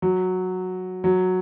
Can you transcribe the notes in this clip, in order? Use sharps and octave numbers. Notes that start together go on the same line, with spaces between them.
F#3
F#3